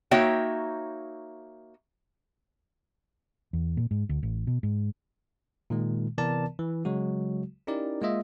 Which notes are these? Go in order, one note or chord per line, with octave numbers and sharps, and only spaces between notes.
A#3 D#4 F#4 C#5 E5 G5
E2
A#2
G#2
D2
A1
B2
G#2
A#2 D#3 G#3
C3 E3 B3 A#4 D5 A5
E3
C#3 F#3 G#3 F#4
C#4 D#4 E4 G4 A#4 D5
G#3 A#3 F4 D#5 E5